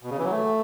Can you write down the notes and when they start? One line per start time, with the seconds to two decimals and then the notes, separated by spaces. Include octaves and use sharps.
0.03 B2
0.10 C#3
0.18 E3
0.24 F#3
0.31 A3